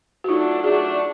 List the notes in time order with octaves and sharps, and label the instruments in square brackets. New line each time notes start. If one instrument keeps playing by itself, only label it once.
[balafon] F#4
[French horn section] F#3 A3 D4 [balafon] D#4 F4
[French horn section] F#3 A3 D4 [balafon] F#4 G#4